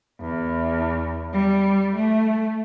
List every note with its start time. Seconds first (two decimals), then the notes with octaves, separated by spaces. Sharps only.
0.21 E2
1.33 G3
1.96 A3